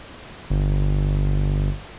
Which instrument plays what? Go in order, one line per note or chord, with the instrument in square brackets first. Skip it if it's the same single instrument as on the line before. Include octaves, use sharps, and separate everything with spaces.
[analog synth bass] G1